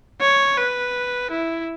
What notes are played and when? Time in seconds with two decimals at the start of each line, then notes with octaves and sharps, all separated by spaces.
0.21 C#5
0.58 B4
1.31 E4